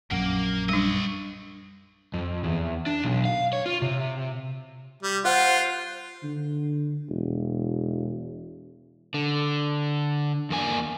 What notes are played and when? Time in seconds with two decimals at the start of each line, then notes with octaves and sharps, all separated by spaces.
0.11 A#1 F#2 A#3 F#5
0.69 G3 D4 C#5 D#5
2.14 F2
2.44 E2
2.86 D4
3.04 B1
3.25 F5
3.53 C#5
3.66 F4
3.82 C3
5.03 G3
5.25 F4 C5 F#5
6.23 D3
7.10 E1
9.14 D3
10.50 E2 A#3 G#5